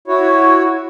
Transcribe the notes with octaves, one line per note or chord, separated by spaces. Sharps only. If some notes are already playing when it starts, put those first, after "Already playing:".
E4 F#4 C#5